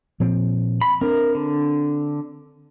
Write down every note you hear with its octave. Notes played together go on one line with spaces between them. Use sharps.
A#2 F3 C4
B5
C4 D4 A#4
D3